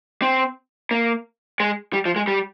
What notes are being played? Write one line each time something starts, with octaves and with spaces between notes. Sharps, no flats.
C4
A#3
G#3
G3
F3
G#3
G3